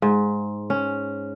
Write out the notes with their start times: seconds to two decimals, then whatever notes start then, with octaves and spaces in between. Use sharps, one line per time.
0.02 G#2
0.70 C#4